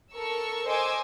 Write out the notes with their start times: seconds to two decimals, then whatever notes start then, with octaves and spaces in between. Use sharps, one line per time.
0.13 A4 A#4 C#6 E6
0.66 C5 D#5 G#5 C6 D6 E6